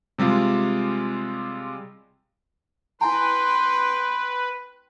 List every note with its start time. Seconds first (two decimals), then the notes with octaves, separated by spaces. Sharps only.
0.18 C3 G3 G#3 F4
3.01 E4 B4 G5 G#5 A#5 C6